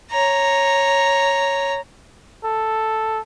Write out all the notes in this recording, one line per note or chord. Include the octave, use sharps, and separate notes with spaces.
C#5 A#5
A4